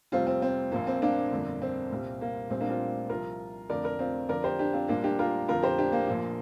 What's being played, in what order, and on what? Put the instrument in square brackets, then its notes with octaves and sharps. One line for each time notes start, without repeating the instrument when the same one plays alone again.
[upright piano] F1 F2 C3 G3 C4 F4
C4
C4
A#1 A#2 F3 A#3
C4
A#3 D4
G1 F2 D3
C4
C2 A#2 G3
A#3
A#1 A#2 G3 C4
A#3 D4
C4 F4
C2 C3 F3 F4 A#4
F1 F2 D3 F3 A#4 D5
A#4 D5
C4 F4
F2 D3 F3 A#4 D5
G4 C5
D4 G4
C4 F4
A#1 A#2 G3 A#3 D4
D4 G4
F4 A#4
F2 D3 F3 F4 A#4
G4 C5
D4 G4
A#3
A#1 A#2 F3